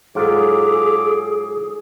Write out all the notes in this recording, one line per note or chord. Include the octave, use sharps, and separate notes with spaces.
G#2 F#3 F4 G#4 A4 D6